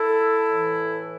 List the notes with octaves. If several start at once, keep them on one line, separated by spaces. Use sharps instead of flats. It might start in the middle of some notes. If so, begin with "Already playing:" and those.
Already playing: E4 A4
A2 E3